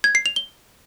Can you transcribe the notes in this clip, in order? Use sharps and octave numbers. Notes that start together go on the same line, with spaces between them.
G#6
C7
F7
G7